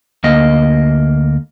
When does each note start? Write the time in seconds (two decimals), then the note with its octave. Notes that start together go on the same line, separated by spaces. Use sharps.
0.24 D2 A#3 D#5